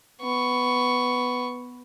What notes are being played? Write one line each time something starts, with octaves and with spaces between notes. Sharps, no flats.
B3 C#6